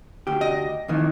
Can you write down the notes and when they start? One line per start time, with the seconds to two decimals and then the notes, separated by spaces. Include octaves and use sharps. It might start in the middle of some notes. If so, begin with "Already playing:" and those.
0.27 D2 G4
0.41 D#5
0.88 F2 D#3 E3